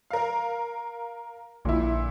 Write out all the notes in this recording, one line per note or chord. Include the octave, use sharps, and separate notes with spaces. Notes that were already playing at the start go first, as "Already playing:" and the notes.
A#4 F5
A#1 A#2 D3 E4